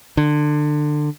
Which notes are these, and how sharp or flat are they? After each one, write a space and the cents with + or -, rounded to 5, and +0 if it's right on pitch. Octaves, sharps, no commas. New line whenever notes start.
D3 +25